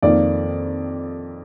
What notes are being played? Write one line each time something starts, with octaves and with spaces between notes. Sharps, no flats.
F2 D#3 A#3 D5